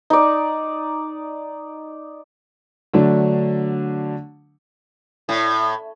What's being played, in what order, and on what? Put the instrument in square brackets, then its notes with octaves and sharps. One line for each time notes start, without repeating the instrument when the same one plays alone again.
[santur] D#4 D5
[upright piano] D3 F#3 A3 D4
[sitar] A2